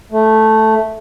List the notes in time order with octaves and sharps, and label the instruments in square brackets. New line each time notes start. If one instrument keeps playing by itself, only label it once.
[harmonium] A3